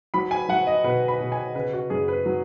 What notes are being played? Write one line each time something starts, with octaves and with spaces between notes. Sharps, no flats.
F#3 B5
G#5
F#3 F#5
D#5
B2 B4
B5
B2
G#5
C#3 B4
F#4
F#2 G#4
B4
F#3